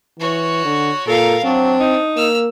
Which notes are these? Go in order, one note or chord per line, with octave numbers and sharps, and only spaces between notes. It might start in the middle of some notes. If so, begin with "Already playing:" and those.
E3 F#4 C#5
D3
A#2 A4 A#4 F5
F#3 C4 D4
D#4
A#3 E6 F6